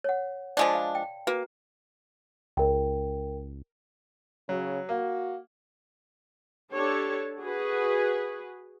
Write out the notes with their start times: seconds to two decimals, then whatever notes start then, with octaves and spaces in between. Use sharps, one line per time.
0.04 C#5 F#5
0.57 F3 G#3 D4 D5 F5 A5
0.73 F5 B5
0.95 G5
1.27 A#3 F#4 B4
2.57 C#2 A#4 G5
4.49 C#3 F#3
4.89 A#3 F#4
6.73 D4 G4 A4 C#5
7.41 F#4 G#4 B4